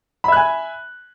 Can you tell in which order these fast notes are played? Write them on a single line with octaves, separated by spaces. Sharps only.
B5 E5 F#6 G#5